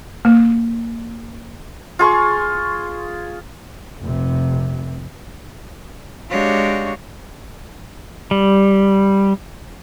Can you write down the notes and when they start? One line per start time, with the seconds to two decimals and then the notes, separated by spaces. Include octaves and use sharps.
0.25 A#3
1.99 F4 G#4 C6 C#6
4.01 F1 C3
6.29 G#3 D4 F#4 G4 C#5 F5
8.31 G3